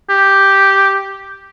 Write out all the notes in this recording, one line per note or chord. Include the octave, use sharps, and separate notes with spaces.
G4